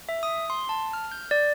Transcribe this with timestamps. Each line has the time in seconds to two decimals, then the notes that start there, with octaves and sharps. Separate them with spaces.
0.09 E5
0.23 D#6
0.50 C6
0.69 A5
0.93 F6
1.11 G6
1.31 D5